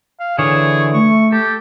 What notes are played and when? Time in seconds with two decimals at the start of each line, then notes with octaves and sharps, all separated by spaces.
0.20 F5
0.39 D3 E3 G#4 C#5
0.93 A3 C#6
1.32 G4 A4